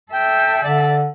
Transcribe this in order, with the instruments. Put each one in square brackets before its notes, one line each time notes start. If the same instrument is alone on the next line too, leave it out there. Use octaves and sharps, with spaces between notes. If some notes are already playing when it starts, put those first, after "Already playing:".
[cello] A4 E5 [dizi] G5
[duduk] D3 [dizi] D5